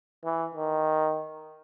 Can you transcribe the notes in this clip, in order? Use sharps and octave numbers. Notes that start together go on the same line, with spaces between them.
E3
D#3